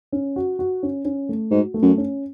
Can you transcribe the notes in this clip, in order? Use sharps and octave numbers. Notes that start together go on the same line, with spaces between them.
C#4
F#4
F#4
C#4
C#4
A3
G#2 F#4
A3
F#2
C#4